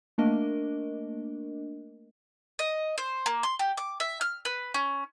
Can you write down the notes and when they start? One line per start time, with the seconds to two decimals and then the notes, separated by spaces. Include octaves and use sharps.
0.18 A3 A#3 D4 A#4 D#5
2.59 D#5
2.98 C5
3.26 A#3
3.43 C6
3.59 G4
3.77 D6
4.00 E5
4.21 F6
4.45 B4
4.74 C#4